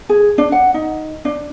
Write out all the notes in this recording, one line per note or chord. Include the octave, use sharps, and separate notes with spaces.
G#4
D4
F#5
D#4
D4